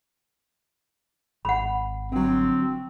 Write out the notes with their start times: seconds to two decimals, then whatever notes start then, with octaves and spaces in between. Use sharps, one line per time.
1.45 G#1 F#5 B5
2.12 D3 F#3 C4